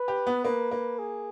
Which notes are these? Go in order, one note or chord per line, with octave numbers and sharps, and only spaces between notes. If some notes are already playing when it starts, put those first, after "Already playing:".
Already playing: B4
G4
B3
A#3 B4
A#3
G#4